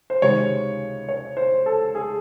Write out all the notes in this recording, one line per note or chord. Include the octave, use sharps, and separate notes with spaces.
C5
C#2 C3 D#3 G#3 C#5
C#5
C5
A4
G#4